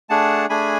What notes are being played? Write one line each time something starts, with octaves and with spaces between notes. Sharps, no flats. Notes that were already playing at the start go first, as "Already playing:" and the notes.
A3 D4 G#4 F#5 A5
A3 D4 G#4 G#5 B5